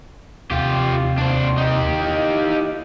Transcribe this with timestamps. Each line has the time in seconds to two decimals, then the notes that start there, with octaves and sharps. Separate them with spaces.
0.51 D#2 C3 F4 G4
1.18 D4 C5
1.58 D#4 G4
2.00 E4